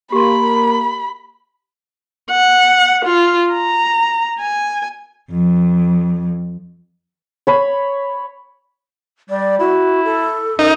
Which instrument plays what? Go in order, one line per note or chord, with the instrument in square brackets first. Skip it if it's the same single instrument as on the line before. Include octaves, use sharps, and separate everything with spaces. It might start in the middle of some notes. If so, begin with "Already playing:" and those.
[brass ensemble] A#3 [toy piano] G4 C6 [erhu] B5
[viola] F#5
F4
A#5
G#5
[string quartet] F2
[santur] C#5 B5
[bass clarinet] G3 [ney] D5
[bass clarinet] E4 [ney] F#4
[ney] A4
[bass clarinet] F#2 [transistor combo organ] D#4